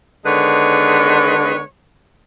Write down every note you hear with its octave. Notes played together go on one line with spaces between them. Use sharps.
D3 D#3 G#3 B3 B4 C#5